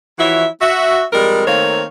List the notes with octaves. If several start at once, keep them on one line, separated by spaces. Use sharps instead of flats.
E3 F3 E4 F#4 C#5 E5
F#4 E5
F2 G3 G#3 A#4
D#3 A3 A#3 C4 C#5 F5